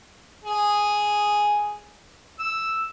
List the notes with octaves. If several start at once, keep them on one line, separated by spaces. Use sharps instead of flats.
G#4
E6